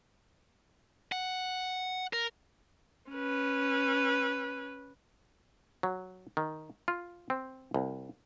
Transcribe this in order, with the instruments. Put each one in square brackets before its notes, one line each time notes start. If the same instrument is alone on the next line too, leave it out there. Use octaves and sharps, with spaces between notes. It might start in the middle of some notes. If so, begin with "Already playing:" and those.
[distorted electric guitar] F#5
A#4
[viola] C#4 B4
[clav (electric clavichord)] F#3
D#3
F4
C4
C2